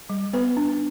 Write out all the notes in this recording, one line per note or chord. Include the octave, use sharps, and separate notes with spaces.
G3
B3 B4
D4